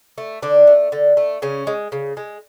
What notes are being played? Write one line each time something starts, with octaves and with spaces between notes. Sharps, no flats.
A3
D3 D4
A3
D3
A3
C#3 C#4
G#3
C#3
G#3